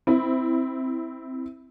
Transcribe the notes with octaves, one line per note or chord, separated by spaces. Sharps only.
C4 E4